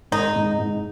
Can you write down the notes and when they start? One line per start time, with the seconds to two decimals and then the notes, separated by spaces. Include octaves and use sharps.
0.11 G#2 D#4
0.36 G#2
0.59 G#2